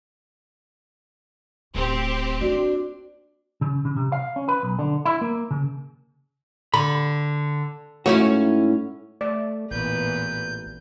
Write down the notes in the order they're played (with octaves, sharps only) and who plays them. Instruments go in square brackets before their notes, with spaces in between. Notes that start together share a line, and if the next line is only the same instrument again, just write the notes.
[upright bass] D1 [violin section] C4 G4
[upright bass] A#3 [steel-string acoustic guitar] D4 [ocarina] F#4
[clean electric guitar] C#3
C#3
C3
F5
C#4
B4
B1
D3
E4
A#3
C#3
[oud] D3 [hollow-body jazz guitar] B5
[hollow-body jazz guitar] G#2 A3 F#4 [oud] C#4 E4 C#5
[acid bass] A3 [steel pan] D5
[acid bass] A1 [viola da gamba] E2 A#2 B4 [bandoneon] G6